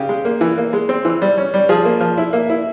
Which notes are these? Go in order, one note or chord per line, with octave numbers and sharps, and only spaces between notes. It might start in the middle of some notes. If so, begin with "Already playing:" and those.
Already playing: C#3 G4
G#3
A#3
E3
A#3
G#3
C4
E3
G3
C#4
G3
F3 G#4
A#3
F3
E4
A#3
E4